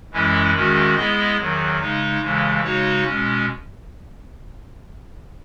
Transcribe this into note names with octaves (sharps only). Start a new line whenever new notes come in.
F#2 E3 G#3 C#4 E4
E2 D#3 G#3 C#4 F#4
G#3 B3 E4 G#4 D#5
E2 D#3 F#3
C#3 G#3 D#4
D#2 C#3 E3 G#3
C#3 G#3 D#4 F#4 C#5
B2 G#3 C#4